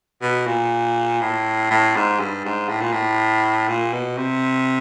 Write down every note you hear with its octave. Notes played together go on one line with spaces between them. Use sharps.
B2
A#2
A2
A2
G#2
G2
G#2
A2
A#2
A2
A#2
B2
C3